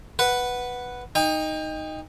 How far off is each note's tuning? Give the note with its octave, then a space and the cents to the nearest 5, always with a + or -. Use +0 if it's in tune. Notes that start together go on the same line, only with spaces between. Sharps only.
B4 +0 F#5 +0
D#4 +0 G5 +30